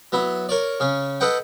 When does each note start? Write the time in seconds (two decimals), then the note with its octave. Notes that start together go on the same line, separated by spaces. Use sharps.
0.12 F#3 B3 E4
0.49 A#4 C#5 D5
0.80 C#3 C#4
1.20 A4 B4 D#5 F#5 G5